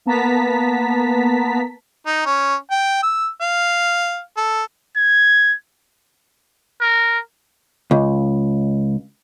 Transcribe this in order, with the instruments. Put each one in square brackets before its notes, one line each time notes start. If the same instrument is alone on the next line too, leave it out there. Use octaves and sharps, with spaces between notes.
[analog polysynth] A#3 B3 A5 A#5 B6
[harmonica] D#4
C#4
G5
E6
F5
A4
[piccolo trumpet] G#6
[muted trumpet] A#4
[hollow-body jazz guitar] C#2